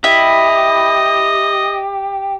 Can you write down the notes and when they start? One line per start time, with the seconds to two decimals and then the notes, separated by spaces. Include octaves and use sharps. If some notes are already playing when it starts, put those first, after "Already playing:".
0.04 E4 G4 D#5